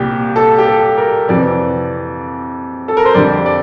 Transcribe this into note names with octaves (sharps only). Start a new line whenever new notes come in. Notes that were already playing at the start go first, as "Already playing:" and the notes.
Already playing: C2 A#2 G3 G4
A4
G4
A4
A#4
F2 C3 E3 D5
A4
A#4
C5
F2 D3 G3 D5
D5